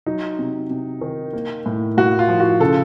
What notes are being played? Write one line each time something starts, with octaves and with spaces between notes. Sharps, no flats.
F#3 D#4
C3
C3
D#3
A#3
A2
A2 F#4
F4
F3
F#4
C#3 A4